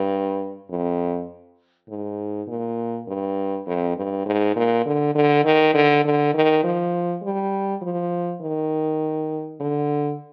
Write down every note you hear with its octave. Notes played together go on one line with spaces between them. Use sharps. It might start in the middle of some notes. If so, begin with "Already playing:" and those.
Already playing: G2
F2
G#2
A#2
G2
F2
G2
G#2
A#2
D3
D3
D#3
D3
D3
D#3
F3
G3
F3
D#3
D3